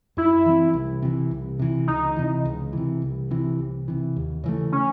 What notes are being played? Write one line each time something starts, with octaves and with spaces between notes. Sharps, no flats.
F#2 E4
E3 C4
C2
C3 E3
C2
C3 E3
C#2 D#4
C3 E3
C#2
C3 E3
C2
C3 E3
C2
C3 E3
D#2
C#3 E3 A3
C#4